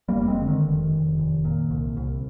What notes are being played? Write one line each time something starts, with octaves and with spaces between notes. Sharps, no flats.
G3 A#3
F1
A#3
G#3 C4
D3
D#3
F1
F1
F1
A#2
C2
C2